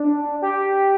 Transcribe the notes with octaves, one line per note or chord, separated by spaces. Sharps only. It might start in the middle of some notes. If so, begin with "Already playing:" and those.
Already playing: D4
G4